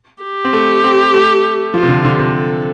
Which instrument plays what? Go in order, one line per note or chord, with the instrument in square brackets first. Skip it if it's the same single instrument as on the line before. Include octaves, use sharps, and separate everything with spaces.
[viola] G4
[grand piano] C4
A3
C4
A3
[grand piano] F3 [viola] F4
[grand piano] C3
D3
[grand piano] D3 [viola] G4
[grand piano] C3
[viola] A4